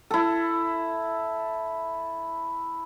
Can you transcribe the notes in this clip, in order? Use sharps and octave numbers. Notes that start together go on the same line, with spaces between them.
E4 A4